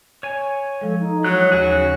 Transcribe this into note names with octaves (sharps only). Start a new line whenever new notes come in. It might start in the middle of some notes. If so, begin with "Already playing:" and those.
C#5 G#5
F3 G#3 A4
D#4
E3 F#3 D#4 C#5 F#6
D#2 C#3 A#3 F#4 G#4 C#5